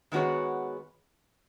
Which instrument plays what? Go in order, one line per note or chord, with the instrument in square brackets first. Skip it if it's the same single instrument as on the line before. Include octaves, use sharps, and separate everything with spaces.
[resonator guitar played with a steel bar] D#3 G#3 B3 F#4 C#5